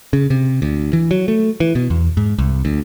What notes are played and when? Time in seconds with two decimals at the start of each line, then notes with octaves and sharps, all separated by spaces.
0.13 C#3
0.30 C3
0.62 D2
0.93 E3
1.11 F#3
1.28 A3
1.60 E3
1.75 B2
1.90 E2
2.17 G#2
2.38 C2
2.65 D2